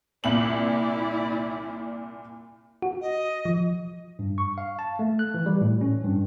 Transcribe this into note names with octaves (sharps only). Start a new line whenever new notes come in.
C2 A#2 E4 D5 F#7
F#4
D#5
F3
G2
C#6
F5
A5
A3
F#6
E3
G3
A2
C#4
G2